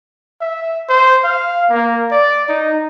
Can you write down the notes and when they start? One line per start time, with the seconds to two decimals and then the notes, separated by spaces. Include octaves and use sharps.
0.41 E5
0.89 C5
1.24 F5
1.70 A#3
2.12 D5
2.49 D#4